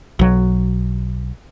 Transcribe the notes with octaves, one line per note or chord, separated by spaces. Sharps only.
B1 F#3